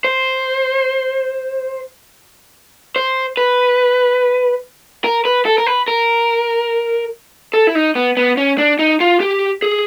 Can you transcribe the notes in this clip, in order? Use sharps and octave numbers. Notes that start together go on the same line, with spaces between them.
C5
C5
B4
A#4
B4
A4
A#4
B4
A#4
A4
E4
D#4
B3
B3
C#4
D4
D#4
F4
G4
G#4